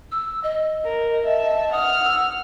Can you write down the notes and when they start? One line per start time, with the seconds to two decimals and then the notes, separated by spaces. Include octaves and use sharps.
0.12 E6
0.44 D#5
0.84 A#4
1.24 E5 A5
1.72 F#5 D#6 F6
2.05 E6